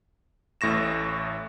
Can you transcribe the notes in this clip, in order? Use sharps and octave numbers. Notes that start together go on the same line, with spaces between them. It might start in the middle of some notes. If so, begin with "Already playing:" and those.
A1 A2 C#6 A#6 E7